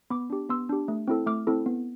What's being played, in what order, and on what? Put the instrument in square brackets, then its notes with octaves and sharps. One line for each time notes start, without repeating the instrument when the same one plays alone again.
[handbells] B3 B5 D6
D4 G4
B3 C6 E6
D4 G4
A3
C4 E4 A4
A3 D6 F6
C4 E4 A4
B3